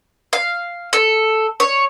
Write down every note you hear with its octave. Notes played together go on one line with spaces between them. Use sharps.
F5
A4
C#5